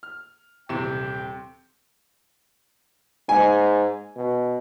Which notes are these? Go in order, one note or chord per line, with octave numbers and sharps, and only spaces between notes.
F6
D#1 C3 E3 G5 E7
G#2 G#5
B2